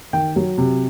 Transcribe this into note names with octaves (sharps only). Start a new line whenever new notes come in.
D#3 G5
F#3
C3